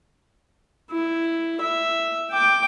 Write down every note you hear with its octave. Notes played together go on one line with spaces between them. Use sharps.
E4
E5
G5 D6